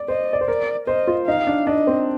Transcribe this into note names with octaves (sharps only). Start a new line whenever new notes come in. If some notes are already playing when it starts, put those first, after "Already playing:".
Already playing: D5
C5 D#5
D5
C5
A#4 D5
C5 D#5
F4
D#4 F5
D4
D4 D#5
C4